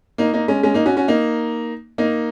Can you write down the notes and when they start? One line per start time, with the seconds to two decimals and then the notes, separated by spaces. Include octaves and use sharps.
0.18 A#3 D#4
0.33 A#3 D#4
0.48 G#3 C#4
0.63 G#3 C#4
0.74 A#3 D#4
0.86 C#4 F#4
0.97 C#4 F#4
1.08 A#3 D#4
1.98 A#3 D#4